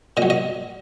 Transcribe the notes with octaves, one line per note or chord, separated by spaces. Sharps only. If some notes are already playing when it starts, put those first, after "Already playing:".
A#2 D#5
F#3
D#5